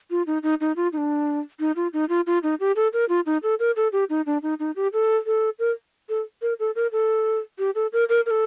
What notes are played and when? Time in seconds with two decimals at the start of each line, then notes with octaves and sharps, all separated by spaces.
0.11 F4
0.27 D#4
0.43 D#4
0.61 D#4
0.76 F4
0.93 D#4
0.98 D4
1.60 D#4
1.76 F4
1.93 D#4
2.09 F4
2.27 F4
2.43 D#4
2.60 G4
2.76 A4
2.93 A#4
3.09 F4
3.26 D#4
3.43 A4
3.60 A#4
3.76 A4
3.93 G4
4.10 D#4
4.26 D4
4.43 D#4
4.60 D#4
4.76 G4
4.93 A4
5.26 A4
5.59 A#4
6.09 A4
6.42 A#4
6.59 A4
6.75 A#4
6.92 A4
7.59 G4
7.75 A4
7.93 A#4
8.09 A#4
8.26 A#4
8.31 A4